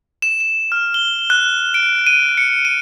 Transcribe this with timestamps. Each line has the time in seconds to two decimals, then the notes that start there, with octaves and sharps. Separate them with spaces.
0.22 E7
0.40 E7
0.72 F6
0.94 G7
1.30 F#6
1.74 D7
2.07 D#7
2.38 C#7
2.65 D#7